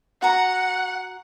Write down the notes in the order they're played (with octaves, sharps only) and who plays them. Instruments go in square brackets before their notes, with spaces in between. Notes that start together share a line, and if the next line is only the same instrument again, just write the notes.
[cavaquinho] F#4 A#5 [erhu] F#5